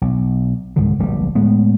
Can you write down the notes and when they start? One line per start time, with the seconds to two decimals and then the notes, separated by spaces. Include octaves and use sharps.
0.01 B1
0.76 C2 G#2 D3 D#3
0.99 D1 A#1 G3
1.35 A2 G#3 B3